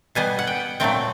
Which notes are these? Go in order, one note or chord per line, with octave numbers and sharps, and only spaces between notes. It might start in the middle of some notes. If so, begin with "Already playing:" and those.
B2 G3 B3 G#5
F#5
G5
A#2 F#3 A3 C4 G5